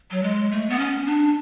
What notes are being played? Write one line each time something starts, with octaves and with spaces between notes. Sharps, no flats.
F#3
G#3
A3
B3
C#4
D4